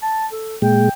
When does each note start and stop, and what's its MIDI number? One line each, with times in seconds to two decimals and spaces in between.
0.03 0.26 81
0.32 0.57 69
0.62 0.89 46
0.62 0.89 56
0.62 0.91 79